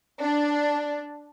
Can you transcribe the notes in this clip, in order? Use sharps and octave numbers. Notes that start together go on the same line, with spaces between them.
D4